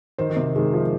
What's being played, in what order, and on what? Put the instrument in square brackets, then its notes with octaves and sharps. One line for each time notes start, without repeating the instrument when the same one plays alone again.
[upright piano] D#3 [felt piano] C5
[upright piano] D#3
C3
[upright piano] D#3 [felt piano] G#3
[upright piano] F3